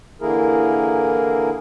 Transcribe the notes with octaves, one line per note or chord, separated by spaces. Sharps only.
D3 E3 A#3 E4 G#4 A#4